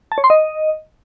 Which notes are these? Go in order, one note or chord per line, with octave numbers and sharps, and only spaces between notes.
A5
C#5
C6
D#5